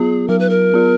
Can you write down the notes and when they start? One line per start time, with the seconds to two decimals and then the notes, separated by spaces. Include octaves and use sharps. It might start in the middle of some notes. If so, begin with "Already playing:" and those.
Already playing: F#3 B3 F4 G#4
0.28 F#3 A#4
0.39 B4
0.49 A#4
0.74 B3 F4